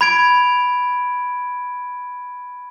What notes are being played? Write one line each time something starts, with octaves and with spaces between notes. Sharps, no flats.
B5 G#6 D7